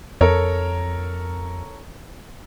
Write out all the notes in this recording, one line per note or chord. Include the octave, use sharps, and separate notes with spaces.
F2 A4 A#4 C#5